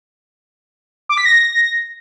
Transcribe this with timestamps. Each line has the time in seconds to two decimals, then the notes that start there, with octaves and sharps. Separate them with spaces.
1.09 D6
1.17 B6
1.26 A#6